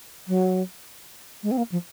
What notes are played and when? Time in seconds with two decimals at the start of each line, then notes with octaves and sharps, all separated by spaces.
0.28 F#3
1.43 G#3
1.51 C4
1.58 A#3
1.72 F3